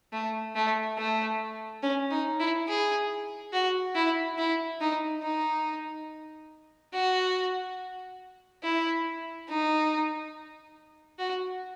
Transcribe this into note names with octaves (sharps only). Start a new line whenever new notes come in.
A3
A3
A3
C#4
D#4
E4
G#4
F#4
E4
E4
D#4
D#4
F#4
E4
D#4
F#4